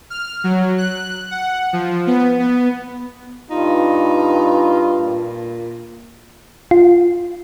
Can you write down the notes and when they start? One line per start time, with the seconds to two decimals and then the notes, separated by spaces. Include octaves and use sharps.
0.10 F6
0.44 F#3
0.78 F#6
1.31 F#5
1.73 F3
2.07 B3
2.39 B3
3.51 G2 D#4 F4
5.00 A#2
6.71 F4